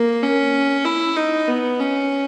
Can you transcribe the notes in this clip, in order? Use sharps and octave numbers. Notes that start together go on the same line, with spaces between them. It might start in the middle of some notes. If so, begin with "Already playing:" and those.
Already playing: A#3
C#4
E4
D#4
B3
C#4